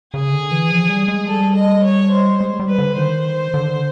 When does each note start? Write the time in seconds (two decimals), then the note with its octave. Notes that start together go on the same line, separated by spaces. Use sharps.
0.14 C#3 G#4
0.32 D3
0.52 E3
0.70 F3
0.89 G3
1.08 G#3
1.27 G3 A4
1.55 D#5
1.84 C#5
2.12 C5
2.40 G#3
2.60 G3
2.69 B4
2.78 D3
2.97 D#3 C5
3.54 D3